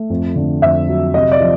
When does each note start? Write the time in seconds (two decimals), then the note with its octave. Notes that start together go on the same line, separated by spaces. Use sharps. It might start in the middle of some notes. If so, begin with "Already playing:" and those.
Already playing: A3
0.10 F2
0.36 D3
0.62 F2 E5
0.88 F#3
1.14 C3 D#5
1.32 D5
1.40 F3